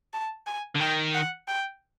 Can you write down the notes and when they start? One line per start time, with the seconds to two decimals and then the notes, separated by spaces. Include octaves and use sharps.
0.13 A5
0.46 G#5
0.76 D3
0.80 D#3 G5
1.14 F#5
1.48 G5